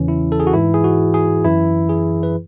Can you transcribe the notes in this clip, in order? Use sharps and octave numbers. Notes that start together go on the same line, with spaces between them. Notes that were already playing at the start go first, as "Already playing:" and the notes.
Already playing: E2 C#3 E3 C#4
E4
A4
G#4
F#4
G#2 E3 E4
G#4
F#4
G#4
F#2 E3 E4
G#4
B4